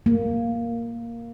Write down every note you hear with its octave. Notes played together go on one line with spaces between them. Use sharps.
A#3